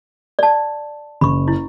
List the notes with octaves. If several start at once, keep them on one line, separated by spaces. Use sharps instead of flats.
D5 A5
F#1 B5 C#6
E4